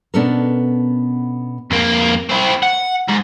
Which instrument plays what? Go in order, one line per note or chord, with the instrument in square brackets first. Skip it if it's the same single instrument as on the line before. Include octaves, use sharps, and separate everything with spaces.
[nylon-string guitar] B2 B3 C#4 D4 A4 A#4
[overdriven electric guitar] F2 A#3
C4 E4
F#5
G#2